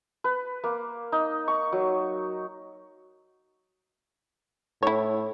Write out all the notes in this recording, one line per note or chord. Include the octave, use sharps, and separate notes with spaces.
B4
A#3
D#4
C#6
F#3
A2 E4 C#5